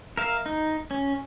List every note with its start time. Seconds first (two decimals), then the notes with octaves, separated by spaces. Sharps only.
0.17 A#4 E5 F5
0.46 D#4
0.91 C#4